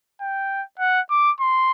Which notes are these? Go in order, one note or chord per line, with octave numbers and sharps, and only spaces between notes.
G5
F#5
D6
C6